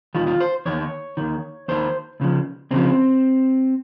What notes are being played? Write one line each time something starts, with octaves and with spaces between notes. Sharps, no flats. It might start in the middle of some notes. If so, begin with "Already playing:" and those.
D#2 D#3 F4
F4
C5
D#2 D#3 C#5
D#2 D#3
D#2 D#3 C5
C#2 C#3 F3
C#2 C#3 F3 C4